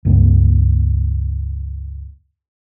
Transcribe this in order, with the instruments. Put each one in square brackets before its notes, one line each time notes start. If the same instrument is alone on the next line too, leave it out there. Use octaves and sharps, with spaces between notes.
[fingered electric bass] C#2 G2 A#3